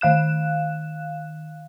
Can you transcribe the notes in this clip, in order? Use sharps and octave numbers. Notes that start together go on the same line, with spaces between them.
D#3 F5 F#6 E7